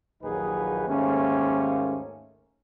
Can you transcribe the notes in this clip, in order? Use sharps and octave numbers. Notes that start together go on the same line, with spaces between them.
A#1 D#2 F#3 D#4 G#4 B4
D#2 G#2 A3 A#3 C#4